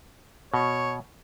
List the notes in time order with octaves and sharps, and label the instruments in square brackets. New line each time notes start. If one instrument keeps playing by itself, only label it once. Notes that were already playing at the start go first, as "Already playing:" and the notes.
[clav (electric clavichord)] B2 [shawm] C#5